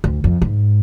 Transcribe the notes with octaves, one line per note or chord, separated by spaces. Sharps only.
D2
F2
G#2